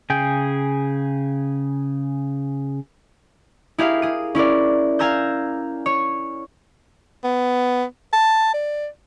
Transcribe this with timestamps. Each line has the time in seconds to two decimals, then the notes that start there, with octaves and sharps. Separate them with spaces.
0.10 C#3 G#4 G5
3.78 E4 G4 G#4 A#4 E5 F5
4.02 G#4 D#7
4.35 C#4 E4 A#4 D5
4.99 F5 G#5 A#5 E6 G6
5.86 C#5
7.24 B3
8.13 A5
8.54 D5